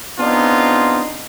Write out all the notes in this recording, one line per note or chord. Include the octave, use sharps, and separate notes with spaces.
B3 C4 D4 D#4 F4 G#4